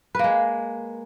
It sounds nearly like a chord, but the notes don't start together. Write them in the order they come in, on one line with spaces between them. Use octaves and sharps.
B4 A#3 G#3